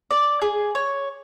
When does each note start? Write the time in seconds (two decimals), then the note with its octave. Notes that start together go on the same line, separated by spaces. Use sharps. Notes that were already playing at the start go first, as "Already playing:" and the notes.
0.11 D5
0.42 G#4
0.75 C#5